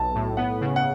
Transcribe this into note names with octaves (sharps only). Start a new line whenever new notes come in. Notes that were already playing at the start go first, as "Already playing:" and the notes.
Already playing: B1 A5
A2
B3 F#5
C#3
F#5